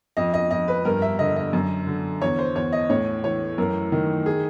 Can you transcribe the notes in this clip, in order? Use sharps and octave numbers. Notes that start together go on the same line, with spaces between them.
F2 D#5
D#5
F2 D#5
B4
G2 A#4
E5
D3 D#5
D#5
F#2
D3
E2 C#5
C5
E2 C#5
D#5
A2 C#5
E3 C#5
F#2 A#4
D#3
G#4